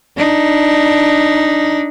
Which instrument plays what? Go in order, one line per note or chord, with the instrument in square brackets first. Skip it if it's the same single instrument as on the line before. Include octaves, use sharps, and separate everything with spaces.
[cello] D4 D#4